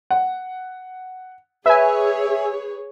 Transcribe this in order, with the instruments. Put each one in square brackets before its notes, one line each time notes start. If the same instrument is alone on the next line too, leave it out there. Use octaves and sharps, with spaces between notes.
[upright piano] F#5
[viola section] G#4 C#5 [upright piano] B4 [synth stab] E5 G#5